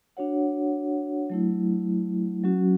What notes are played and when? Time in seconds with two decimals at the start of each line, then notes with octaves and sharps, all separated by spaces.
0.17 D4 F#4 C#5 F#5
1.30 F#3 A3 E4
2.44 F#3 C#4 F#4